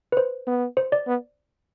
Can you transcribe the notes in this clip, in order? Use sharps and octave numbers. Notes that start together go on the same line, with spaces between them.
B4
C5
B3
C5
D5
B3